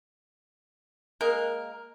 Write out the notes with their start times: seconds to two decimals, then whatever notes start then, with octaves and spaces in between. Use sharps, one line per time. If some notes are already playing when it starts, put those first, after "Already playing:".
1.21 G#3 A#3 A#4